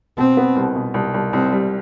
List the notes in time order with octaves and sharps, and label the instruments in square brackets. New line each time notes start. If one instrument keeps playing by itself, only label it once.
[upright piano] B2 [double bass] C4
[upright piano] B3
C2
B2
C2
C2
[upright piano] C2 [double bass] C4
[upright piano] G3